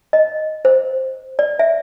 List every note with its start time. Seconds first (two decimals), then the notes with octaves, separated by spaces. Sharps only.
0.13 D#5
0.65 C5
1.39 D5
1.59 E5